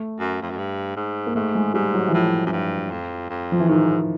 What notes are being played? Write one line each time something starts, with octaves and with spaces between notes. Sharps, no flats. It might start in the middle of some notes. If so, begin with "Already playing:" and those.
Already playing: A3
F#2
F2
F#2
G2
G#2
A#3
G#2 A3
G#3
G#2 G3
F#3
E3
A2 F3
F#2
G2
F2
F2
F3
E3
G#2 D#3